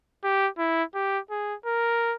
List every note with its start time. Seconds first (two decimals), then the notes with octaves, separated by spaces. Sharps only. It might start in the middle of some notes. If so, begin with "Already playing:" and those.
0.24 G4
0.58 E4
0.94 G4
1.30 G#4
1.66 A#4